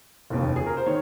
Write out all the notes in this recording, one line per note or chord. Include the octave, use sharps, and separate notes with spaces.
F1 D#2 C#3
G#4
A#4
C5
D#3 C#5